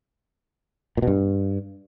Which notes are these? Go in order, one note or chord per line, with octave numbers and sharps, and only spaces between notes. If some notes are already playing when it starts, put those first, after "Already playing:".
A#2
B2
G2